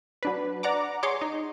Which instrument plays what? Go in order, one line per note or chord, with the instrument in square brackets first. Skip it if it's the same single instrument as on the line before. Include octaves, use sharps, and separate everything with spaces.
[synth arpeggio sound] F#3 D4 B4
D5 F#5 A#5 D6
G#4 C#5 C6 D6
D#4